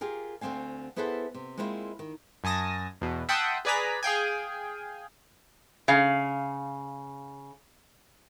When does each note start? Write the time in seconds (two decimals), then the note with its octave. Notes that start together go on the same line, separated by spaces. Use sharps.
0.01 F4 G4 G#4 A#4
0.41 D2 D3 G#3 C4 F5 G#5
0.96 B3 E4 G#4 A4 C5 F#5
1.34 C3
1.57 G#3 A#3 C4 C#4 E4 F4
1.99 D#3
2.44 F#2 G#5 A5 D#6 A#6
3.01 E2 B2
3.29 E5 F#5 G5 A5 C6 D#6
3.65 G#4 B4 D5 G#5 A#5 B6
4.03 G#4 F5 G5 G#5
5.88 C#3 F5